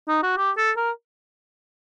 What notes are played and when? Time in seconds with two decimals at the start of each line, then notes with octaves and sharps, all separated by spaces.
0.08 D#4
0.23 F#4
0.37 G4
0.57 A4
0.77 A#4